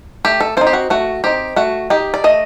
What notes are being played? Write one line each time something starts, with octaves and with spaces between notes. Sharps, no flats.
A3 G4
A4
C4 D#4 C5
G4
F#4
A3 F#4
C4 D#4 G4
A3 F#4
D#4 G4
D5
A3 D#5